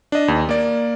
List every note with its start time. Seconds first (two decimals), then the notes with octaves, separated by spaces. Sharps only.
0.12 D4 D#5
0.28 D#2
0.49 A#3 D5